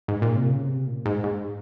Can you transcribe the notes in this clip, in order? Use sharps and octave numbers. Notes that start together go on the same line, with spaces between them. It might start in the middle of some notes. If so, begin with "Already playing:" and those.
G#2
A#2
C3
C#3
C3
A#2
G#2
G#2